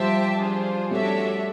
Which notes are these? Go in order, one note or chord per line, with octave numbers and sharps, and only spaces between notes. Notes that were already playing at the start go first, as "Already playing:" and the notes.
Already playing: F3 G3 G4 C5 E5 A5
D4 F4 G#4 C5
G3 A3 D4 F#4 A4 C#5 E5